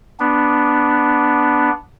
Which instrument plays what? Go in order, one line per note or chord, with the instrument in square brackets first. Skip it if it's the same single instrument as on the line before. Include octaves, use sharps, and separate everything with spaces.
[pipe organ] B3 D4